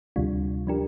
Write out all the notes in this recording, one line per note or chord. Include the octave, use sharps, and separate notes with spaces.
D2 C3 G3 D4 F4
F3 D4 G4 A#4